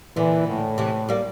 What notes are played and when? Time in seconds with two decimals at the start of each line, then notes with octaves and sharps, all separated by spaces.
0.16 A#2 D3 E3
0.48 A2
0.78 C3 E3
1.09 G3 A#3